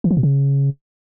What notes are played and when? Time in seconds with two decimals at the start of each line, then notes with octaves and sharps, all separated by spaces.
0.04 E3
0.11 F3
0.17 B2
0.23 C#3